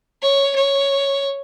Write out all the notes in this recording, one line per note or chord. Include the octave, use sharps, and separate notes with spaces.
C#5
C#5